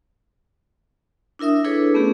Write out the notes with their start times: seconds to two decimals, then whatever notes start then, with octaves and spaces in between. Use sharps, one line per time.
1.39 D4 E4 A#4 E5 D#6
1.64 D4 E4 G#4 A4 B4 C#5
1.94 A3 B3 C#4 G4